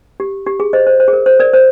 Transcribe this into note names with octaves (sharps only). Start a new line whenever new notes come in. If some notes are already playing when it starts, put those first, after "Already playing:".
G4
G4
G#4
C5 D#5
C5
C5
G#4
A#4
C5
A#4 D5
C5